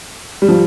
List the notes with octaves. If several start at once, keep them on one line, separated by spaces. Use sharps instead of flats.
G3
F3